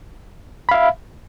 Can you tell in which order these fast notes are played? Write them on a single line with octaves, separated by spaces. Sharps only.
B5 F5 E5